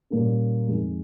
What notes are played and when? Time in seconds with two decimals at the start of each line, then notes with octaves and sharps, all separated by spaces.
0.10 A#2 G3 A#3 C#4
0.68 F2 D#3 G#3